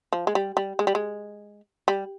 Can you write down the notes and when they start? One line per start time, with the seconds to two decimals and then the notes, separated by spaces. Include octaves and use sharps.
0.13 F3
0.27 G#3
0.35 G3
0.57 G3
0.79 G#3
0.87 G3
0.95 G#3
1.88 G3